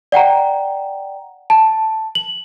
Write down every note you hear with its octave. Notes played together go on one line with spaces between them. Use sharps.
D5 F#5 G5 A#5
A5
F#7